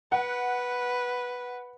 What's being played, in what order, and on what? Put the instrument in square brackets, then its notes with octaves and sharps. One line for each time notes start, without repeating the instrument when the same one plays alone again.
[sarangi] B4 [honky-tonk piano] F#5